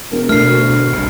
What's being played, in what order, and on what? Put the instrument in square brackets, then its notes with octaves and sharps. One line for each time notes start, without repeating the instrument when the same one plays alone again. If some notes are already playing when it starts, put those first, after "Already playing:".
[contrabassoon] E1 [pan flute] A#4
[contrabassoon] D2 [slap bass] B2 A3 [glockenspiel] F6 C7
[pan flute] F#4
[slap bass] B2 D4
F#1 C2